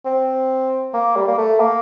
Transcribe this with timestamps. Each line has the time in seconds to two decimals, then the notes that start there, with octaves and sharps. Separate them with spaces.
0.05 C4
0.94 A#3
1.16 G3
1.28 A#3
1.38 A3
1.60 A#3